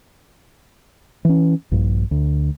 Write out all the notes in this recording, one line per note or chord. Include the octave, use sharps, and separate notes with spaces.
E3 C#4
A#1 G2
D2